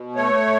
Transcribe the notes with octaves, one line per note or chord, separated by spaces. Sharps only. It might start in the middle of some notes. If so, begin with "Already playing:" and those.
Already playing: B2
A3 C#5